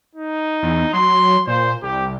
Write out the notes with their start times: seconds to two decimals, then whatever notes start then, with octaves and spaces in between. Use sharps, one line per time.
0.15 D#4
0.63 E2
0.93 F#3 C6
1.47 A#2 C5
1.82 C2 G4